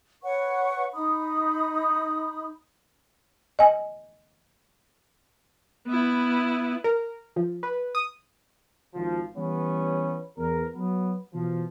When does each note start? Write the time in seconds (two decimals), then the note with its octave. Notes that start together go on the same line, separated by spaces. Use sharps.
0.23 B4 C#5 F#5 C#6
0.93 D#4 B5 D#6
3.59 D#5 G#5
5.88 B3 E4
6.84 A#4
7.36 F3
7.63 B4
7.95 D#6
8.94 G#1 F3
9.35 E3 G3 B3 C#4
10.37 E2 A#4
10.74 F#3 B3
11.32 B2 E3 F3